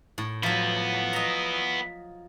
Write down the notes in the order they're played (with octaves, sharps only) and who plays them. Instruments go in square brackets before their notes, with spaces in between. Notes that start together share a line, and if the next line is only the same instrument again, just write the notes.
[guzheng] A2
[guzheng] F3 F#3 [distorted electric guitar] B3 E4
[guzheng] D#5 A#5